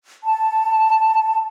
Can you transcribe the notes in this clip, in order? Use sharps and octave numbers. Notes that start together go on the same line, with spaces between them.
A5